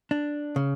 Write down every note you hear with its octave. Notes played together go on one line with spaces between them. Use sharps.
D4
C#3